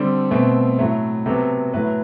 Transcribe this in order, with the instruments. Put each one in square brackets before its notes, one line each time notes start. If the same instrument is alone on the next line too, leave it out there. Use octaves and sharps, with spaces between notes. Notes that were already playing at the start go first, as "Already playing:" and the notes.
Already playing: [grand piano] D3 G3 C4 A4
B2 A3 C4
A2 F#3 A3
C3 F#3 B3 A4
A2 F#3 A3 B4